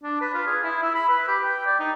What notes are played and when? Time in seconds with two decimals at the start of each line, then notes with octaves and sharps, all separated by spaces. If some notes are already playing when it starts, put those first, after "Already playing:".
0.03 D4
0.21 B4
0.34 F4
0.47 G#4
0.63 E4
0.83 E6
0.95 B5
1.09 B4
1.28 G4
1.44 G5
1.66 D5
1.80 D#4